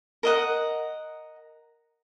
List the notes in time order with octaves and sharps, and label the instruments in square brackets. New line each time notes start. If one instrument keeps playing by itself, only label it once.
[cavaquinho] A#4 D#5 F#5